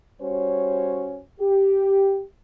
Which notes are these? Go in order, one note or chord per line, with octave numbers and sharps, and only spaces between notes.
G3 C#4 F#4 C5 C#5
G4